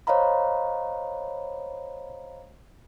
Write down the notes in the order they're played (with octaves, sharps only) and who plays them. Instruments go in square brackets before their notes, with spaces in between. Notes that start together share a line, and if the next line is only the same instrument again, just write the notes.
[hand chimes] C5 C#5 D#5 F5 A#5 B5